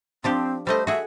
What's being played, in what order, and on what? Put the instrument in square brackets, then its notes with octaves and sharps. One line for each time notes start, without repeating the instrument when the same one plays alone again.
[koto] F3 D4 G4 [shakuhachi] C4
[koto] G3 A3 D#5 [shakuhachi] C5
[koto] F#4 G#4 [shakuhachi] E5